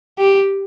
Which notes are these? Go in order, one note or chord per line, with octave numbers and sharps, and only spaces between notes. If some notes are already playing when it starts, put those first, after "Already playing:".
G4